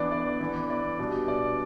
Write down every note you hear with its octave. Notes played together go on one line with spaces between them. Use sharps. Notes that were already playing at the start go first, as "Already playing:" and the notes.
Already playing: E3 B3 D4 D5
D5
E3 B3 E4
D5
B2 G3 D4
D5